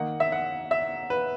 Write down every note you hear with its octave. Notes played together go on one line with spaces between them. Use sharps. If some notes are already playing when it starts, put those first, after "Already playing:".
Already playing: D#3 A#3 D#4 F#5
E5
F#5
E5
B4